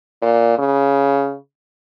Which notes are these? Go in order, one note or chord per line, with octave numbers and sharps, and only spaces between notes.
A#2
C#3